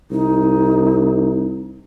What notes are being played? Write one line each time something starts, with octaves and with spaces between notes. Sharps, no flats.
C2 D#4